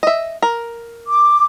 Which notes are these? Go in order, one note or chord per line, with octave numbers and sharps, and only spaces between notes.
D#5 E5
A#4
D6